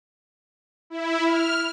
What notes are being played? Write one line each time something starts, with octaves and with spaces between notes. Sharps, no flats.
E4
F6